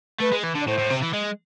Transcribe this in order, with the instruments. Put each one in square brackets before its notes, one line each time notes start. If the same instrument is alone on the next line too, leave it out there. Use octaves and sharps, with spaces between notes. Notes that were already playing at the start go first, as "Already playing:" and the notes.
[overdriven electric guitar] A3 [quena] B4
[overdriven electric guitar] G#3
E3
D3
[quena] D5
[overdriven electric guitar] A2 [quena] C5
[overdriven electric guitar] A2
C3
E3
G#3